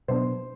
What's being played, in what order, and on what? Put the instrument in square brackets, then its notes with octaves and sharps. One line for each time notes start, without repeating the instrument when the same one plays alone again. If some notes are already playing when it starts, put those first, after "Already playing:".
[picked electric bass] B2 F#3 B3 D4 [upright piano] C5